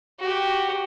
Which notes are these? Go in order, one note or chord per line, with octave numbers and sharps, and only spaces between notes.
F#4 G4